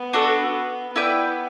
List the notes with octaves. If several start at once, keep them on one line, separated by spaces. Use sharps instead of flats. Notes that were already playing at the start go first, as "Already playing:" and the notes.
Already playing: B3
D4 F#4 A4
B3 E4 B4 D5 G5